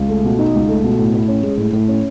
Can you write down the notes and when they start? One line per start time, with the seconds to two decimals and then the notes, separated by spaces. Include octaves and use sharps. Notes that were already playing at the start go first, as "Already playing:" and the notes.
Already playing: C#2
0.09 A3
0.24 B2
0.39 D#4
0.54 C#2
0.69 A3
0.84 B2
0.99 A2
1.14 A2
1.28 C#4
1.43 G#3
1.57 A2
1.73 A2
1.88 C#4